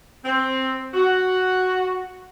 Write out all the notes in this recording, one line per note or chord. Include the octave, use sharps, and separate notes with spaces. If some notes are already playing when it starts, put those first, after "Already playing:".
C4
F#4